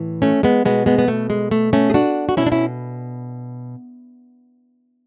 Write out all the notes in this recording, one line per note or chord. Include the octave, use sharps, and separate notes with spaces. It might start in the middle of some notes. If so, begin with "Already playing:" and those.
Already playing: A2 E3
A3 C#4
G#3 B3
B2 G#3 B3
G#3 B3
B3
A3
G#3
A3
A3 C#4
G#4
D4 F#4
F#4
B2 C#4 E4
D4
C#4 E4